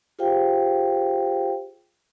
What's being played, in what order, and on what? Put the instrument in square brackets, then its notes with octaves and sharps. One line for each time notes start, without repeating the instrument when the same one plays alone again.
[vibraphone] F4 G4 G#4 C5 F5 G5